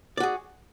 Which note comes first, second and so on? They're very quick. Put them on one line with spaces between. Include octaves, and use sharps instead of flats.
D5 F#4 G#4